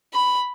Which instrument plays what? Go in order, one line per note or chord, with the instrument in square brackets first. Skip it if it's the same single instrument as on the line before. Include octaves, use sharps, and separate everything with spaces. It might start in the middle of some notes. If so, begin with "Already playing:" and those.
[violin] B5